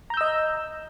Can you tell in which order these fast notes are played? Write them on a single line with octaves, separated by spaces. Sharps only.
A#5 G6 E6 D#5